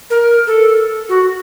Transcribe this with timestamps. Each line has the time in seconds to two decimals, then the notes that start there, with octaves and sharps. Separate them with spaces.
0.10 A#4
0.47 A4
1.09 F#4